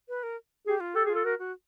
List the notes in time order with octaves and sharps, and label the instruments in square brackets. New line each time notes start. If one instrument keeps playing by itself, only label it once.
[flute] B4
A#4
[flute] G4 [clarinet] G#4
[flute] F4
[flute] G4 [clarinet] A4
[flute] F4 [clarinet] G#4
[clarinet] A4
[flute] F#4 [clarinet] A#4
[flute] F#4